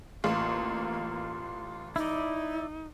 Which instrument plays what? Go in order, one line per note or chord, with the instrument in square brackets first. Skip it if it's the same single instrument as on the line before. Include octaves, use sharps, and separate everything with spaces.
[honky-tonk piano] A1 [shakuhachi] A#3 [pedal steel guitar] F4
[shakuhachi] D#4 [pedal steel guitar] E4 D5